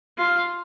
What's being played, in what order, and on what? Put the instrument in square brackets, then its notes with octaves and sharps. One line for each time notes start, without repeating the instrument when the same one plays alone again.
[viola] F4